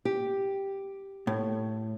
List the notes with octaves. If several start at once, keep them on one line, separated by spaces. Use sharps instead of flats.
G4
A2